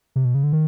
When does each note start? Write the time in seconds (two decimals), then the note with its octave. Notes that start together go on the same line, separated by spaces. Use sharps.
0.16 C3
0.25 B2
0.35 C#3
0.43 D3
0.53 D#3